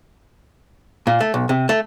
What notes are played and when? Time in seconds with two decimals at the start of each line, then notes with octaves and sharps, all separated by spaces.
1.07 A#2
1.21 A3
1.34 B1
1.49 C3
1.69 A3